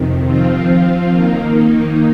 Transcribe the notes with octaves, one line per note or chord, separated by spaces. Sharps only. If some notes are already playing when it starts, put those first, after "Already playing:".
Already playing: F2 C3 D#3
F3 C4 F4
D#3 A#3 D#4